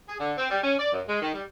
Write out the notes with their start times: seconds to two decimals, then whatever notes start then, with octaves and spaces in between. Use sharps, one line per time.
0.09 G#4
0.20 D3
0.38 C4
0.51 G3
0.64 C#4
0.79 D5
0.93 F#2
1.09 G#3
1.22 D#3
1.34 G3